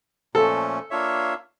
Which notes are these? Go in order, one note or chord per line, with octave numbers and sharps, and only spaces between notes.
A#2 F3 A3 C#4 A4
A#3 D4 F4 C#5 E5